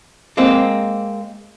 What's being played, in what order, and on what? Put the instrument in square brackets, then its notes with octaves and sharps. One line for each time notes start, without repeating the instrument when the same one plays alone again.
[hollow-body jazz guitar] G#3 A#3 C4